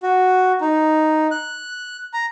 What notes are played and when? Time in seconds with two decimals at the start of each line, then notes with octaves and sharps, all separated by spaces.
0.03 F#4
0.61 D#4
1.31 F#6
2.13 A#5